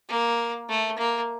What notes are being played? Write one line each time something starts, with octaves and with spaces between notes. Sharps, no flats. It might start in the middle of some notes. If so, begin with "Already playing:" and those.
A#3
A3
A#3